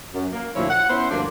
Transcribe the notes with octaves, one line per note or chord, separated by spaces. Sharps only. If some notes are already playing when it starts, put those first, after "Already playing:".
F#2
A#3
D2 A#2 F3 A3 E4 C#5
F#5
B3 C#4 E4 C5
D2 G2 F3 A#3 D4